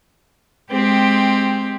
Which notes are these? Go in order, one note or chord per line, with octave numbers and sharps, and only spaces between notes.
G#3 C4 G4